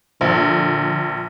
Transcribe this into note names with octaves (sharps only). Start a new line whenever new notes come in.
A#1 D3